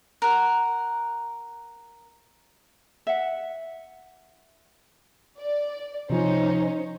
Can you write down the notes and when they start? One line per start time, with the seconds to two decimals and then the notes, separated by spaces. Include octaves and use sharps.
0.22 A#4 F#5
3.07 E5 F#5
5.38 D5
6.10 C3 F3 C#4 D#4 C5